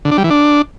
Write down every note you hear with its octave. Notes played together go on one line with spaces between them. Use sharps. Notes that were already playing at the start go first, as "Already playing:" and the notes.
D3
D4
G3
E3
D4